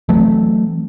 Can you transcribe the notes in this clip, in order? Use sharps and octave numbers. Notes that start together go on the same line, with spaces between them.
E3 F#3 A3 C4